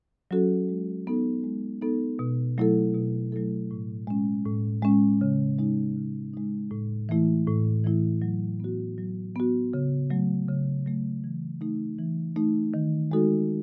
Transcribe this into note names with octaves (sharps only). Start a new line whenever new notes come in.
F#3 C#4 F#4 A4
G#3
B3 D#4 A4
G#3
B3 D#4 A4
B2
F#3 A3 E4 A4
B2
F#3 A3 E4 A4
A2
G#3 C#4
A2
G#3 C#4
C#3
G#3 D#4
C#3
G#3 D#4
A2
E3 A3 E4
A2
E3 A3 E4
F#3
B3 F#4
F#3
B3 F#4
C#3
F#3 A3
C#3
F#3 A3
E3
A3 D#4
E3
A3 D#4
D#3
G#3 D#4 F#4 A4